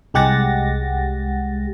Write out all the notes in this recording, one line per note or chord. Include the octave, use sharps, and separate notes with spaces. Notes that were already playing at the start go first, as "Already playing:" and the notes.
C2 G#3 G4 F#5 A6 A#6